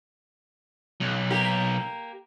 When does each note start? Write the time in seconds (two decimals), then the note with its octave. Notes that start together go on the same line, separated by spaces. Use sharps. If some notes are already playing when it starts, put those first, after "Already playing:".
1.01 B1
1.31 A#3 G4 A#4